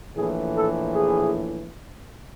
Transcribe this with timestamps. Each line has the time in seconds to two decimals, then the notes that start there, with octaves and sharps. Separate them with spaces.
0.16 A#1 A2 E3 G#4
0.56 A4
0.95 G#4